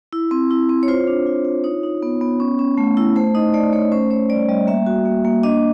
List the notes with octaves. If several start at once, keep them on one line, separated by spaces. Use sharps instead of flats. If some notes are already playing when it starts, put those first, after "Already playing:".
E4
C4
E4
C4
C#5
F4 C5
D4
F4
F4
D#4 C#5
D#4
B3
B3
C#4
C#4
A3
E4
A3 C5
D#4 D#5
A3 D5
A3 C#5
C#4 C5
C#4 C#5
G3 D5
G3 D#5
A#3 E5
F#4
A#3
A#3
D4 D#5